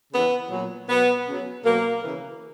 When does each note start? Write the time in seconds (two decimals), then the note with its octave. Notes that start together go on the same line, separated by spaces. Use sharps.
0.12 C#3 E3 B3
0.50 A#2 F#3
0.88 B2 F#3 B3
1.27 C#3 F#3
1.64 B2 F#3 A#3
2.03 C#3 E3